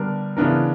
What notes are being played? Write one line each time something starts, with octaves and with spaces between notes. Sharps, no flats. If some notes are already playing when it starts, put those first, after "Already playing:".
Already playing: D3 G3 B3 D4 A#4
C#3 E3 B3 D4 A#4